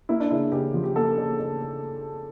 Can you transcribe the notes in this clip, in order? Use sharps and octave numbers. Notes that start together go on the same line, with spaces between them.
A#3 E4
D4
C#3 E4
C#3 G4
F3
G4
A#3 A4
C#3
C#3